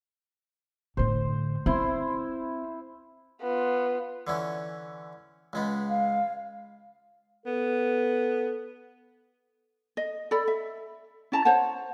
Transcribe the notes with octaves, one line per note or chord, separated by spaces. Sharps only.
A2 D3 C5
C4 E4 C5 C6
B3 F4
D3 E3 C#4
C#2 G#3 B3
F5
B3 A4
D#5
A4 D5 B5
E5
C#4 E4 A5 A#5
C5 C#5 F#5 A5